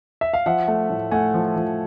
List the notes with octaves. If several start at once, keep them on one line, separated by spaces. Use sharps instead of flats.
E5
F5
F3 E5 F#5
A3
A2
A3 F#5 G#5
F3
F3